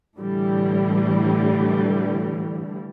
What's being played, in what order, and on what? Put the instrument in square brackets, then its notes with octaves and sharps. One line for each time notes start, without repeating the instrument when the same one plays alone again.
[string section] A2 D3 E3 G3